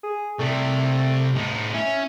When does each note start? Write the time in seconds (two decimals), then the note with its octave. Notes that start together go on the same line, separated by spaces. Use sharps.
0.03 G#4
0.39 C3 G3 A3
1.36 A2 D#4
1.74 C#4 E4